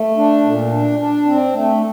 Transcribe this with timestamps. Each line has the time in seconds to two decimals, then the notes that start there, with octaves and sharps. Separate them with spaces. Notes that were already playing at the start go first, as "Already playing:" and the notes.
Already playing: A3
0.17 D4
0.44 A#2
0.72 D4
0.99 D4
1.26 C4
1.54 A3